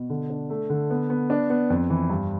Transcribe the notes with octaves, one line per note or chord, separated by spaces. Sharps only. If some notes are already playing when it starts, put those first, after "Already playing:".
Already playing: B2
D3
D4
A3
D3
B3
B3
D4
B3
F2
E3
G2